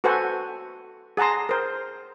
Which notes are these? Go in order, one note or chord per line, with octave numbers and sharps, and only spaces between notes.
F#4 A4 B4 C5 F#5 G#5
G#4 F#5 A5 A#5 C6
A#4 C5